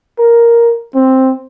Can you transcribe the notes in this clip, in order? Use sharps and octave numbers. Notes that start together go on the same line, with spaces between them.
A#4
C4